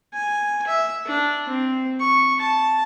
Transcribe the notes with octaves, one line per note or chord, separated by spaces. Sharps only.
G#5
E5
D4
C4
C#6
A5